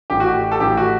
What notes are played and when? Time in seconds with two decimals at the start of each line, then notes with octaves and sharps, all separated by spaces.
0.10 A1 A2 G4
0.20 F#4
0.29 G4
0.51 A4
0.60 A1 A2 G4
0.77 F#4